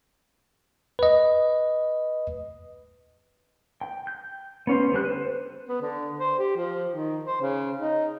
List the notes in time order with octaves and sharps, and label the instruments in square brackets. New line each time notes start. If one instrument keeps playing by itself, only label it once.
[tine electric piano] B4 D#5
[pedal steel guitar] G5
G6
B3 C#4 C5
D3 G3 G4 F#6
B4 C5
[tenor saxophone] B3
D3
C5
G4
F3
D#3
C5
C#3
D#4